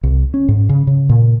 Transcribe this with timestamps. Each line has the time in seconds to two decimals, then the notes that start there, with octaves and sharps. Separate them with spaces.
0.03 C2
0.34 C#4
0.48 G#2
0.69 C#3
0.87 C#3
1.09 A#2